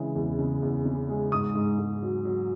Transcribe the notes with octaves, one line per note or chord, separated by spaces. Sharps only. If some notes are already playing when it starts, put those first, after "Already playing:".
Already playing: C#3 E3 G#3
E2
C#3
E2
C#3
G#3
G#2 D#6
G#2
G#2
F#3
F#3